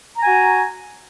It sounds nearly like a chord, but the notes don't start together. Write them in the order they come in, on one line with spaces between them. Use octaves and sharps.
A#5 G#5 F#4